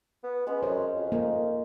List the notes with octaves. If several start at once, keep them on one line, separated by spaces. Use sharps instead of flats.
B3
G#3 B3 C#4
F#2 C5
F2
A#3 D#4